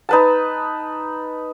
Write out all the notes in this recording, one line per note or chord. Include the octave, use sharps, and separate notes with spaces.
D#4 B4 A5